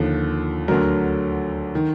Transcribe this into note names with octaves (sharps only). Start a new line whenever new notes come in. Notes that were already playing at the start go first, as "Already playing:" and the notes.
Already playing: D#2 D3 F3
D2 D3 F#3 A#4
D#3